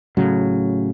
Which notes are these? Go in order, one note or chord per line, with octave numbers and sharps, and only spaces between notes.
A2 C#3 F#3